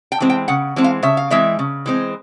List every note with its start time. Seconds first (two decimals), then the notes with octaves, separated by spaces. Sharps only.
0.12 G5
0.20 E3 G#3 C4
0.30 G5
0.48 C#3 F#5
0.76 E3 G#3 C4
0.84 F5
1.03 C#3 E5
1.17 F5
1.30 E3 G#3 C4 E5
1.59 C#3
1.86 E3 G#3 C4